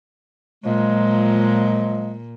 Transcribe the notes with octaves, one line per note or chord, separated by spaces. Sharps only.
A#2 F3 F#3 G#3